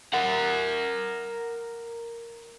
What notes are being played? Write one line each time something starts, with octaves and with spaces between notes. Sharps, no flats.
A#4 F#5